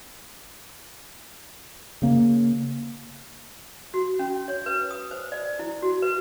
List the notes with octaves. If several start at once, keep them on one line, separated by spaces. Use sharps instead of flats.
C#3 A#3
F#4
C#4
C#5
B4
D#6
C5
D5
E4
F#4
B4